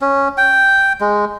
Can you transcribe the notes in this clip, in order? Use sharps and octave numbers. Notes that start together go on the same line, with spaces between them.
C#4
G5
G#3